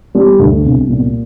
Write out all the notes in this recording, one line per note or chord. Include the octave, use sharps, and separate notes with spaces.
G3
D2
C2
A#2